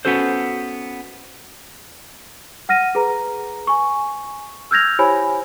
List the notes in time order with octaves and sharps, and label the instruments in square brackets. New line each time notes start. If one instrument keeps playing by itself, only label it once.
[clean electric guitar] B3 C#4 F#4 A4 C5
[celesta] F#5 F6 A#6 D#7
G#4 B4 A#5
G#5 C#6
E6 F6 G6 G#6 A#6 F7
E4 G4 C5 C#5 G#5 B5